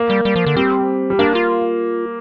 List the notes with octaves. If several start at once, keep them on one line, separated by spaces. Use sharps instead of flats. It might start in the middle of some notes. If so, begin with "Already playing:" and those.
Already playing: A#3
G3
G3
F3
D3
G3 C4
G3
A#3 D4
F4